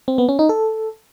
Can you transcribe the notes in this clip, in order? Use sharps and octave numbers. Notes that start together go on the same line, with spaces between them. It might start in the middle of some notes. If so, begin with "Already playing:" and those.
C4
B3
C#4
D#4
A4